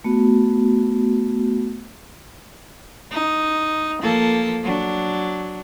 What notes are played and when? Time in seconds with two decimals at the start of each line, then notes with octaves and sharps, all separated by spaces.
0.04 A3 B3 F#4
3.11 D#4
4.02 F3 A#3 A4
4.63 F#3 D4